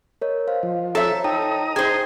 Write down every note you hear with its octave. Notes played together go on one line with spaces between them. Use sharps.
A#4 C#5 D#5
C5 F5
F3
A4 C5 C#5 E5 A#5
D#4 C#5 G5 A5 A#5 D#6
G#4 C5 G5 G#6